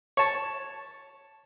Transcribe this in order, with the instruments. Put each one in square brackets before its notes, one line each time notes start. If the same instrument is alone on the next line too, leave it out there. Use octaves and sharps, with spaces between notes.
[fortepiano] C#5 A5